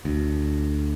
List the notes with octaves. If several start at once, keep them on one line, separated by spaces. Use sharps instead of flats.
D2